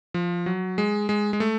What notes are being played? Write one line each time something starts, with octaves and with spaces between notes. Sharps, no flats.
F3
F#3
G#3
G#3
G#3
A3